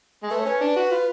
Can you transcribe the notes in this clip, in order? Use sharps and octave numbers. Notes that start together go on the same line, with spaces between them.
G#3
A3 B4
C#5
C#4 B4
D4
F#4
F4